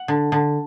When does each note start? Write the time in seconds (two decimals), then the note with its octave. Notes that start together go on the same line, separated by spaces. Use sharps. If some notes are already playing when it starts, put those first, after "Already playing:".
Already playing: F#5
0.08 D3
0.32 D3